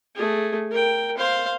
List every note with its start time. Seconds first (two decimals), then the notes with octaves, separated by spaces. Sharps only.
0.15 A3 G#4
0.71 A#4 G5
1.18 C5 F5